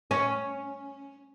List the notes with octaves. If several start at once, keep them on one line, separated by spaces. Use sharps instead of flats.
C#4